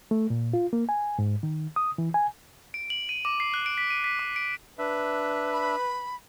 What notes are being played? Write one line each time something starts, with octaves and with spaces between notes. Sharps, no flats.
A3
A#2
F4
A#3
G#5
G#2
D#3
D#6
E3
G#5
D7
F#7
D#7
D6
C7
F#6
D7
B6
D#7
B6
D6
D7
D4 B4 E5
B5